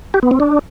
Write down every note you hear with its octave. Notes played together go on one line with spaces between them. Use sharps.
G4
B3
C4
D4